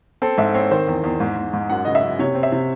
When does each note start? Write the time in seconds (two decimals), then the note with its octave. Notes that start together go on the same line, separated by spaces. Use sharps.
0.22 C4 A4
0.38 G#2 E5
0.54 C4 C#5
0.71 D#3 C5
0.88 E2
1.04 E2
1.20 G#2
1.36 G#2
1.53 G#2
1.70 F#2 F#5
1.85 C#3 D#5
1.95 E5
2.03 F#2
2.19 C3 C#5
2.35 C4
2.43 E5
2.52 C3